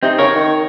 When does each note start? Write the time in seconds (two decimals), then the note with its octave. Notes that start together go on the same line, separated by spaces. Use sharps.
0.03 C3 C4 D#4
0.18 C#3 A#4 C#5
0.35 D#3